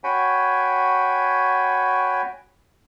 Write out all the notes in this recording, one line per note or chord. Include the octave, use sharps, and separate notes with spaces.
F#4 C#5 G5 G#5 B5